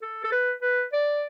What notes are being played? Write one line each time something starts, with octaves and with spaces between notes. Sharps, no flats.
A4
A4
B4
B4
D5